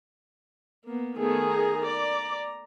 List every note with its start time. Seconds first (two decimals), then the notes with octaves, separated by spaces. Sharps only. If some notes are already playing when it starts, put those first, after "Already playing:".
0.84 A#3 B3
1.18 D#3 A3 B3 G#4
1.51 A#5
1.84 D5